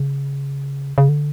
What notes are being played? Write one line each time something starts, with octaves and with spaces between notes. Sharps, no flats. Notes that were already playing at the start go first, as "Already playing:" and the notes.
Already playing: C#3
C#3
D3